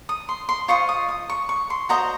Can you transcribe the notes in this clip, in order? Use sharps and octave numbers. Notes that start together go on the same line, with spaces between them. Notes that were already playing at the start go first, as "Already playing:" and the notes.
D#6
C6
C6
F4 C5 D#5 C#6
D#6
D#6
C#6
C#6
C6
F#4 C5 D#5 A#5